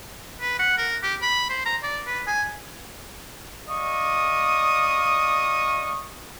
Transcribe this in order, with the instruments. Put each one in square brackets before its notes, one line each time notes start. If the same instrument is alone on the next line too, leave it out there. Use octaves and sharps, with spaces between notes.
[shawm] B4
F#5
A#4
G4
B5
C5
A#5
D5
B4
G#5
[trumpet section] D5 D#5 F5 C#6 D#6